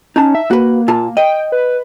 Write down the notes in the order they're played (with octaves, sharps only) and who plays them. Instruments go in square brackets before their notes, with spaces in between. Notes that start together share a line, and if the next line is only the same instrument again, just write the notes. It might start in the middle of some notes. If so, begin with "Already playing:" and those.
[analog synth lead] C#4 [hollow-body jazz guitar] D#4 A5
[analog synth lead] E5
[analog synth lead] A#3 [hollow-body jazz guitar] F#4 B4
[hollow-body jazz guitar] A#2 F4 A5
[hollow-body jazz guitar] D#5 [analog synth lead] G5
[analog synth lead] B4